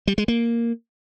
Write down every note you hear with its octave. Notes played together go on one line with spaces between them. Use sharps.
G3
G#3
A#3